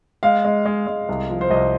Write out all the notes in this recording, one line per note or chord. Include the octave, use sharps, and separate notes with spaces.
G#3 F5
G#3
G#3
G#3
C2
F3
C5
C2 D#5